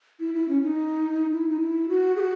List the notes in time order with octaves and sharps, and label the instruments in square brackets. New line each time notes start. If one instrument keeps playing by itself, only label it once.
[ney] E4
E4
C#4
D#4
E4
D#4
E4
F#4
G#4
F#4